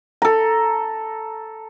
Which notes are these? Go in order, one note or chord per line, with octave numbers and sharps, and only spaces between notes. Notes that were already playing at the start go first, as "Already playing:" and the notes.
A4 A#5